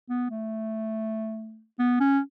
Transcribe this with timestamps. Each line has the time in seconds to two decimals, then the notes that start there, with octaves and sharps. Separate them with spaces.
0.09 B3
0.31 A3
1.79 B3
2.00 C#4